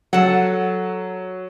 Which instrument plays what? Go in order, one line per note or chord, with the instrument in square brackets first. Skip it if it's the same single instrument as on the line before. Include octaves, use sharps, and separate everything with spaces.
[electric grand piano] F#3 [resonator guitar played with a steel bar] A4 F#5